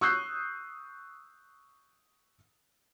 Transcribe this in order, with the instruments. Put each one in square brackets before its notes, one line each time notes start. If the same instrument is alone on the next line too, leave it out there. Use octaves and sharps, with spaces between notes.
[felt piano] C#6 D#6 E6 F#6 G6 C7